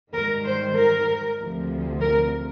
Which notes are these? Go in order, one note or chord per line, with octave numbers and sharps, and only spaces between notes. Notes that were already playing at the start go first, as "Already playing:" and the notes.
G#2 D#3 G3 A#4
C5
A#4
D2 C3 F3
A#4